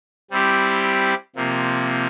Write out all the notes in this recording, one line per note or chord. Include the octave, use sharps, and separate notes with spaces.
G3 C4 E4 G4
C3 F3 A#3